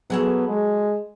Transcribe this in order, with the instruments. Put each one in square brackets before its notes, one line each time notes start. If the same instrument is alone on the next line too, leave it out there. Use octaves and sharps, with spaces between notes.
[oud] F#3 G#4 A4 [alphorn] B3
[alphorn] G#3